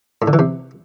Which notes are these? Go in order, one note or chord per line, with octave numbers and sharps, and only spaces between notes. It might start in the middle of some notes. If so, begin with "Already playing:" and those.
A2
D3
E3
C3